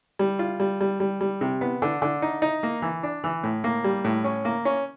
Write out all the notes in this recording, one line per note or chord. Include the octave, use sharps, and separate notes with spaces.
G3
F4
G3
G3
G3
G3
C3
B3
D3
D3
D#4
D#4
A#3
E3
D4
E3
A2
A#3
G3
A2
C#4
A#3
C#4